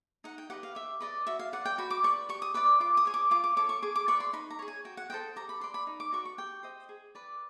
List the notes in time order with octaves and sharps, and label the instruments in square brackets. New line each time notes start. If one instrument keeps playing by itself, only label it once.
[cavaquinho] D#4 F#5
G5
G4 B4 D#5 F#5
F5
G4 E5
B4 D5 D#5
F#4 E5
F5
B4 D5 F#5
G5
F#4 B5
D6
B4 D5 C#6
G4 C#6
D#6
B4 D5 D6
F4 D6
D#6
G#4 C#5
D6
F4 D6
D6
A4 C#5 D6
C#6
G#4 D6
D6
B4 D5 C#6
C6
D#4 B5
A#5
G#4 C#5
G#5
F#4 G5
F#5
A4 C5 D#5 G5
G4 A#5
B5
B4 D5 C6
B5
D#4
D6
F#4 B4 D5 C#6
C#6
G4 G5
C5 D#5
G#4
B4 D5